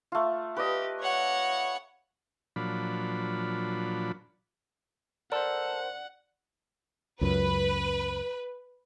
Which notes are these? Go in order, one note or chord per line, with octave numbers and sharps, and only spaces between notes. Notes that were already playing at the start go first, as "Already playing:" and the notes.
A3 F4
G4 B4 D5 D#5
C#5 F#5
A#2 F3 F#3 D4 B5
A4 A#4 C5 D5 F#5
C#2 F#2 B4